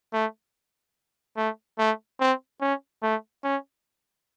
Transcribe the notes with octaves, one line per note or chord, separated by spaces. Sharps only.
A3
A3
A3
C4
C#4
A3
C#4